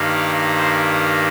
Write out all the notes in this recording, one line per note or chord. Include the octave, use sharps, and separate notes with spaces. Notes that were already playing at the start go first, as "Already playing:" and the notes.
Already playing: G2 D#3 G3 A#3
F5
C5